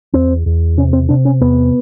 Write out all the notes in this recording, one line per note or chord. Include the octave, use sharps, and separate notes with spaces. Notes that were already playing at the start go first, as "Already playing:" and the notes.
E2 C4
E2
C3 C#4
C4
C3 D4
C#4
E2 B3